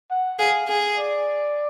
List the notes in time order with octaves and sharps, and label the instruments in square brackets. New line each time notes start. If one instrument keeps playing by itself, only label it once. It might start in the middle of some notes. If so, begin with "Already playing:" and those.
[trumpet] F#5
[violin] G#4 [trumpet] F5
[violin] G#4
[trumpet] D5